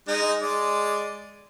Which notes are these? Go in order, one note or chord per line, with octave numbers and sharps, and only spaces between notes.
G#3 D#4
G#3 D5